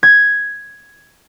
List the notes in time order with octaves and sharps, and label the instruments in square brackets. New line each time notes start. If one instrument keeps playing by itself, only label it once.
[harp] G#6